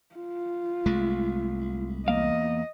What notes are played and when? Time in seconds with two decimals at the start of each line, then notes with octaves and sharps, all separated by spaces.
0.15 F4
0.86 C2 G#3 A3
2.08 E2 A#3 D#5 F5